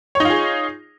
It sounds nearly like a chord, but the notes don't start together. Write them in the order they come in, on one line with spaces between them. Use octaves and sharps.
C#5 D#4 F4 G#4